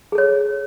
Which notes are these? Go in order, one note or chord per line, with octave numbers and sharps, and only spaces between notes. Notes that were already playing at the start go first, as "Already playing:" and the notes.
G#4 A4 C#5